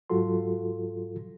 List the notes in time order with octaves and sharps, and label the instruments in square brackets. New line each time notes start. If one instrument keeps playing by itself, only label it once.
[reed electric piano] G#2 F#3 F4 F#4 A4 C6